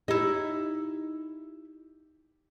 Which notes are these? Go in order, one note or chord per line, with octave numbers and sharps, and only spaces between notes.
D#4 E4 G4